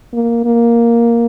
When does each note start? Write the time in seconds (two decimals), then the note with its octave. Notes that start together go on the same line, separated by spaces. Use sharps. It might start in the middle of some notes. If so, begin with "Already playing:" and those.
0.13 A#3
0.45 A#3